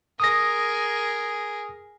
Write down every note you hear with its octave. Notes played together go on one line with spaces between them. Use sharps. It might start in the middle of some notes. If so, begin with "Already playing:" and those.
G#4 A#4 D#6 A#6